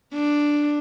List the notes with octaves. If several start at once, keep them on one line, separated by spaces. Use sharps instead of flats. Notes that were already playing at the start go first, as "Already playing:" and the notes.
D4